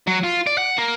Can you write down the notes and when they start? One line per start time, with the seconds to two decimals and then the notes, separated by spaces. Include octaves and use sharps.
0.07 F#3
0.23 F4
0.47 D5
0.58 F#5
0.78 A#3